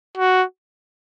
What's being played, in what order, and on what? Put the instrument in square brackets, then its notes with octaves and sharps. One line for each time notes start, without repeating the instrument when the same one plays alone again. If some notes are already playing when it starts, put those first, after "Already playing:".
[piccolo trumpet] F#4